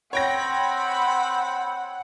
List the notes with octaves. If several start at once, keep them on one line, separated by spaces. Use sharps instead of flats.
C4 C#5 F#5 G5 B5 A#6